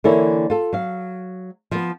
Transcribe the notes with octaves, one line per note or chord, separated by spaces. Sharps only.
D3 E3 A#3 E4 A4 C#5
F4 A4
F#3 F5
F3 B3